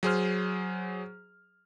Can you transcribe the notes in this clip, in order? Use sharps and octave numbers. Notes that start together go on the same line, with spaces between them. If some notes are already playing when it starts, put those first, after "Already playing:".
F#3 G#4 C5 F6